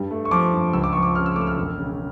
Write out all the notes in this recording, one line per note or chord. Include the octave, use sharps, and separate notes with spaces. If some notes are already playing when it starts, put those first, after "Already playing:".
Already playing: G2 G3
A3
C#6
F3 D6
G2
C#2 E6
D6
F3 C#6
D6
C#3 F6
E6
A3 D6
E6
F6
E1
C#3